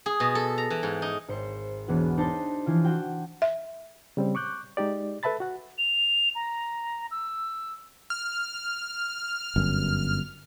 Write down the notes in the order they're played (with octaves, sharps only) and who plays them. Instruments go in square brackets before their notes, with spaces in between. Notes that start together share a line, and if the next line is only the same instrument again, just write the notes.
[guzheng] G#4
B2
A4
A#5
E3
G#2
D#4
[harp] G#1 C5 C#7
E1 E3 B3 F#4
D4 D#4 C5 A5
E3 F3 F4
F#4 G5
[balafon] E5
[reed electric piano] C#3 G3 C4
C#6 D6 F#6 G6
G#3 D#4 G4 D5
A4 B4 E5 A5 B5 A6
F#4 F#5
[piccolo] F7
A#5
E6
[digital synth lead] F6
[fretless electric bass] G1 F#2